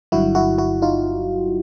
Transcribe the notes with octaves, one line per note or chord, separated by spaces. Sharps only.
G1 G2 D3 F#3 E4 F#4
E4 F#4
E4 F#4
D#4 F4